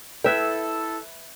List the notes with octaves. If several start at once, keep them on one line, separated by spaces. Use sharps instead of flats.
E4 A4 B4 E5 G5 F#6 G#6